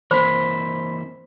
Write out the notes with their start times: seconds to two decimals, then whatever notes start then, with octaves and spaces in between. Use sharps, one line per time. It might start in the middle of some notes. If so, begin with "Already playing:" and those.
0.11 E3 A#3 C4 C5 B5 C6 B6